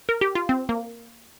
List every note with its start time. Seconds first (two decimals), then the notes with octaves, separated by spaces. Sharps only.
0.09 A#4
0.21 G4
0.35 F4
0.49 C4
0.69 A#3